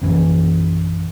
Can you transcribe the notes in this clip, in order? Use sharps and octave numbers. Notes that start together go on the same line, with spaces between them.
A#1 F#2 E3